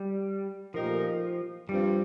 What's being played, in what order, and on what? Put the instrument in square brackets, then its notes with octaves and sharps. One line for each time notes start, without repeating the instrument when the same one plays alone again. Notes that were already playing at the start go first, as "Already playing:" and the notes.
Already playing: [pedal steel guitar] G3
[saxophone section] A#2 A3 D#4 G4 A#4 [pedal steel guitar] F3
[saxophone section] G2 F3 C4 [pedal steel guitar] G3